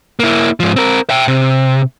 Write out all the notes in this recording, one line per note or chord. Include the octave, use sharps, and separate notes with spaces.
A#3 E4
G#2 F3
C4 A#4
E5 G5
C3